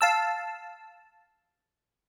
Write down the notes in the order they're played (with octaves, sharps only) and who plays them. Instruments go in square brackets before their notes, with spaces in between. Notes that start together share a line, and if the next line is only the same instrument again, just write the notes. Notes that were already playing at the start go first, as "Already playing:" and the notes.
[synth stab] F5 A5 E6